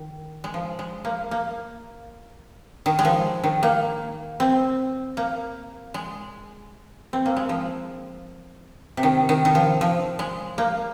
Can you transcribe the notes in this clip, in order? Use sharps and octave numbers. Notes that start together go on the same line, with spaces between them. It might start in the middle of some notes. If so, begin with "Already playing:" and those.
Already playing: D#3
G#3
F3
G#3
A#3
A#3
D#3
G#3
F3
D#3
A#3
C4
A#3
G#3
C4
A#3
G#3
F3
C3
D#3
D#3
D#3
F3
F3
G#3
A#3